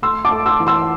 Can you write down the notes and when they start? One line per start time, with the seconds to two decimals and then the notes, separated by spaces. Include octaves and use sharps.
0.02 A3 C6 E6
0.25 A5 D6
0.31 A3
0.46 C6 E6
0.60 E3
0.67 C6 E6